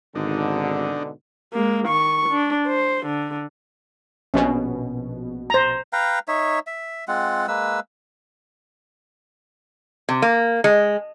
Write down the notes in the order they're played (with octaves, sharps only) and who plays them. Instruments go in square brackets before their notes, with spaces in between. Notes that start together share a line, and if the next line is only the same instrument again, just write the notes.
[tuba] G#1 [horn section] G#2 B2 D3 [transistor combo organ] D4 D#4
[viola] G#3 A#3
D#3 C#6
D4
C5
D3
[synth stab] A#1 B2 [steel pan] C#4
[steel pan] C5 A#5
[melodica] B4 F5 G5 A#5
D#4 C#5 E5
E5
G#3 C4 F4 F#5
G#3 A#3 B4 E6
[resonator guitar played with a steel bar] C3
A#3
G#3